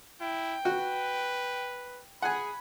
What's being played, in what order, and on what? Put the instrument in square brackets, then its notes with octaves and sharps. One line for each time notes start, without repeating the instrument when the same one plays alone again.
[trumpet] E4 [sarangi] G5
[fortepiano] F#4 [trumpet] B4
[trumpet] G#4 [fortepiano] F#5 G#5 [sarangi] B5